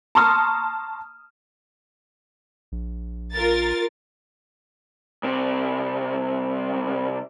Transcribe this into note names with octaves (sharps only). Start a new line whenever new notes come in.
A5 A#5 C6 C#6 D#6 F6
A#1
F4 A#4 A6
C2 C3